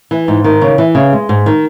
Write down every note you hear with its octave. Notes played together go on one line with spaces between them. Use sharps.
E3
G#2
D#3
C#3
E3
C#3
G#3
G#2
D#3